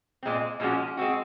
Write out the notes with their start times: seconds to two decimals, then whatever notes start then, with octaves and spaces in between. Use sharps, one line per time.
0.23 A#2 G#3 C4
0.60 A#2 F3 G#3 C#4 F#4
0.97 G#3 C4 F#4